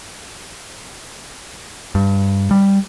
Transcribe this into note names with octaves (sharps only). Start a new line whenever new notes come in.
G2
G3